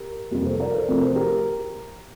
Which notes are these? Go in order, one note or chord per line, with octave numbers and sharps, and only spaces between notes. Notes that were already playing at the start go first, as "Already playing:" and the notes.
Already playing: G4 A#4
F2 C3 G3 A#3
A4 C5
C5
A#4 D5
A4 C5
C3 F3 A3 C4 A#4
C5
G4 A#4